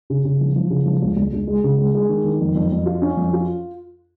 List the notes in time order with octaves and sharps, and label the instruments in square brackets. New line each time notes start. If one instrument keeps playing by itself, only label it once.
[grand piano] C#3
C#3
F3
F3
C#3
F3
C#2
C#2
C#2
G#3
C#3
G#3
G#3
D#3
D#3
F2
F2
F2
F4
C#4
F2
F4